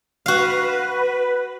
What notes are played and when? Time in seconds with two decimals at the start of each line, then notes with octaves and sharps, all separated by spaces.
0.26 F#4 B4 F5